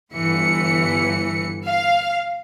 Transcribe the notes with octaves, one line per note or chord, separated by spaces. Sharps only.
G1 E3 C#7
F5